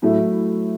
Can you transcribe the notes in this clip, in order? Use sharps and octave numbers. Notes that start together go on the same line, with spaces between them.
A2 F#3 A3 E4